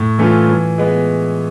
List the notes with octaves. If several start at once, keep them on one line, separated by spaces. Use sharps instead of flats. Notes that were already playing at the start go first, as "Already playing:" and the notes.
Already playing: A2
E3 A3 C#4 F4
E3
G#3 B3